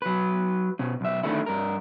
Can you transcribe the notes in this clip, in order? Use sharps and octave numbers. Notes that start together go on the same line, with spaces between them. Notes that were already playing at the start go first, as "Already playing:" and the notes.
F#3 B4
B2 C#4
B1 E5
D3 D#3 G#3 A3 C#4 E4
G2 A#4